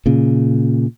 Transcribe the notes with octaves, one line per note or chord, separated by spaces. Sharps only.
A#2 C#3